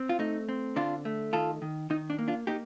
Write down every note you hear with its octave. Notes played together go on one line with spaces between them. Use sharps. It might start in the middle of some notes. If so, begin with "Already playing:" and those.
Already playing: C4
F4
A3 D#4
C4
D3 D4 F4
A3
D#3 F4 A4
D#3
D#3 D#4
D4
A#3
D4 F4
A#3 D#4 G4